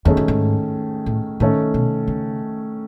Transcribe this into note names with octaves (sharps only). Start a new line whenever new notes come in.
E2 D#3 A3 C#4 G#4
F#2
G#2
A2
A2 D#3 A3 C#4
B2
C#3